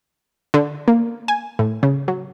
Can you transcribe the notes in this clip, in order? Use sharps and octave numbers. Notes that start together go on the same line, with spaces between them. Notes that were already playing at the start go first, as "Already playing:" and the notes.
D3
A#3
G#5
A2
C#3
F#3